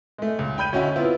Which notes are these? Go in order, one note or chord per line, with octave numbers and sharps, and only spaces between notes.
G#3 A3
C#2
G5 B5 G6 D#7
D2 C#4 F#4 D#5 E5
B3 C4 E4 F4